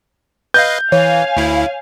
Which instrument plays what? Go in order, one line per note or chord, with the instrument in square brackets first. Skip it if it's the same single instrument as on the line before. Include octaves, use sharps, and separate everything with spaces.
[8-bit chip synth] B4 D#5 F5 [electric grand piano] G6
[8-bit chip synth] E3 [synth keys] C#5 [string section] F5 G#5
[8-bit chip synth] D2 E4